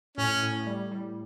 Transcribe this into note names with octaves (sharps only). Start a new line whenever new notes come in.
A2 C#4
A2
G3
G3